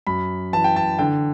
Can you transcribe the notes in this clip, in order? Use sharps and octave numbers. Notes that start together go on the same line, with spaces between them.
F#2 B5
E3 A5
G5
A5
D3 G5